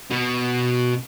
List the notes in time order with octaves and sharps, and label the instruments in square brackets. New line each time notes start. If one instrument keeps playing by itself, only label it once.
[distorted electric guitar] B2